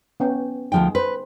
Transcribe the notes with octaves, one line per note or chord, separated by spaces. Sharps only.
B3 C#4 G5
D2 F3 D#4 G#4 G5
B4 C5